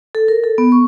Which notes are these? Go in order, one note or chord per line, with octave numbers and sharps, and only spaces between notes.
A4
A#4
A4
B3
C#6